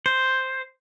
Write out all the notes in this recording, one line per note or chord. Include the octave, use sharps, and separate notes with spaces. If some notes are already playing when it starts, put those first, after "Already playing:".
C5